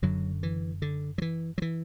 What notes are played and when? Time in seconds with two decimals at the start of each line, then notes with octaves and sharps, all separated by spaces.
0.02 F#1 F#2 D3 F#3
0.43 E3
0.82 D3
1.18 F#3
1.22 E3
1.58 F#3
1.62 E3